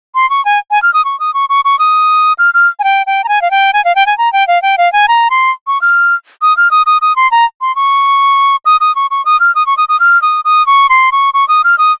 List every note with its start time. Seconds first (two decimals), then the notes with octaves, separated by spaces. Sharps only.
0.15 C6
0.30 C#6
0.45 G#5
0.71 G#5
0.83 F6
0.94 D#6
1.05 C#6
1.20 D#6
1.34 C#6
1.49 C#6
1.65 C#6
1.79 D#6
2.39 F6
2.54 F6
2.79 G#5
2.84 G5
3.07 G5
3.24 A#5
3.29 G#5
3.42 F5
3.51 G5
3.73 G#5
3.85 F5
3.95 G5
4.06 G#5
4.18 A#5
4.33 G5
4.48 F5
4.62 G5
4.78 F5
4.93 G#5
5.08 A#5
5.30 C6
5.67 C#6
5.82 F6
6.42 D#6
6.57 F6
6.71 D#6
6.86 D#6
7.02 D#6
7.16 C6
7.31 A#5
7.61 C6
7.76 C#6
8.66 D#6
8.81 D#6
8.96 C#6
9.11 C#6
9.25 D#6
9.40 F6
9.55 D#6
9.66 C#6
9.77 D#6
9.89 D#6
10.00 F6
10.22 D#6
10.45 D#6
10.67 C#6
10.90 C6
11.12 C#6
11.34 C#6
11.48 D#6
11.64 F6
11.78 D#6